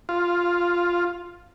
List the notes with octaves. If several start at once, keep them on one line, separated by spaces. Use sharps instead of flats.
F4